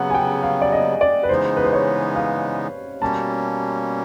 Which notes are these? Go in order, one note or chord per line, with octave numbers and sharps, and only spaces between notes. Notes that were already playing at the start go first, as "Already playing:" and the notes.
Already playing: C#3 F#3 B3 F#5
G#5
G5
F5
D5
D#5
D5
B4
C#3 E3 G#3 B3 D#4 C5
B4
C5
C#5
F5
B2 G3 A#3 C#4 A5